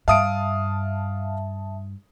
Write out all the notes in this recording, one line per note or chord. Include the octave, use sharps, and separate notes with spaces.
G2 E5 F5 A5 D#6 D7